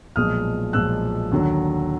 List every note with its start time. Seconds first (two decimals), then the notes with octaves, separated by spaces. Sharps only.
0.16 B1 A#2 F3 G#3 D#6 F6
0.73 B1 A#2 F3 G#3 E6 F#6
1.31 D#2 D3 F#3